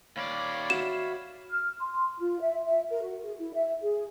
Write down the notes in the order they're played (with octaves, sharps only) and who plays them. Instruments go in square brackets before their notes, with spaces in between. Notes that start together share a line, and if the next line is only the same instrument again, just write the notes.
[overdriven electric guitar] D#2 D5 [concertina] C#5 F5 B5
[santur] F#4 E5 [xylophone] E7
[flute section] F6
C6
F4
E5
E5
A#4
F#4
G#4
E4
E5
G#4